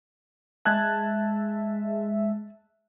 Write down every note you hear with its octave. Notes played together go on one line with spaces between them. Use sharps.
G#3 E5 A5 F#6 G#6